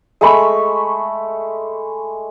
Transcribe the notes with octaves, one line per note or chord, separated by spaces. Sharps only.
G#3 A3 B5 C#6